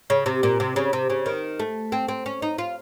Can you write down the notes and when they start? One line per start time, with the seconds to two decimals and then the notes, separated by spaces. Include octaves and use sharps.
0.10 C#3
0.26 C3
0.43 A#2
0.60 C3
0.76 C#3
0.93 C3
1.10 C#3
1.26 D#3
1.60 A3
1.92 C4
2.08 C4
2.26 C#4
2.42 D#4
2.58 F4